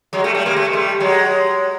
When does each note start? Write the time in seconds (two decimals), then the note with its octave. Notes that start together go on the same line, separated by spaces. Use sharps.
0.13 F#3 G#3
0.24 G3 A3
0.35 G3 A3
0.45 G#3 A#3
0.56 A3
0.65 G#3
0.73 G3 A3
1.00 F#3 G#3